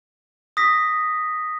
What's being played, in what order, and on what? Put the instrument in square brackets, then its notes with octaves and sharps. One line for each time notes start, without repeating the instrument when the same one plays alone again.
[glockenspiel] D#6 A#6 B6